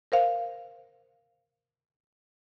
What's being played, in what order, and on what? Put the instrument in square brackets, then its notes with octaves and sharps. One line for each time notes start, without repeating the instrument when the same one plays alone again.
[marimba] A#4 C5 F5